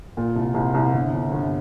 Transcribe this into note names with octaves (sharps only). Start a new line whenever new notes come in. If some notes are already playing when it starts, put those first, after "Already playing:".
A#2
C2
C2
C2
G1
G1
G1